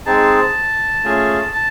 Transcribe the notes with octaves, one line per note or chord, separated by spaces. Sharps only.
G#3 C4 D#4 G#4 A5
A3 C#4 F4 G#4
A5